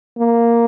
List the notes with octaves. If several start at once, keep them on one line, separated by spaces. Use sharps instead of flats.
A#3